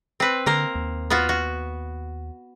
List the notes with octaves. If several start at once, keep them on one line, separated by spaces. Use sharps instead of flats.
C4 B4
D3 A#3 A#4 C5
D#2
B3 F4 F#4
F#4